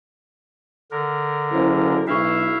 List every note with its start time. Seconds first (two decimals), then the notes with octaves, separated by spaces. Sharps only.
0.91 D3 A#4
1.51 F#1 E4 C5
2.07 B1 D4 E4 E5 F5 C#6